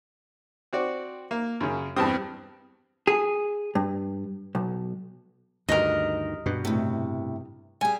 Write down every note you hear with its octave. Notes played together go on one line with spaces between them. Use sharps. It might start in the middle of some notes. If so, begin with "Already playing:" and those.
C4 F#4 D5
A#3
F#2 C#3
E2 G2 C4 A5 D#6
G#4
G2
B1
D2 G2 D#3 A#4 D#5
G2 B2
A2 C3
G3 G#4 G#5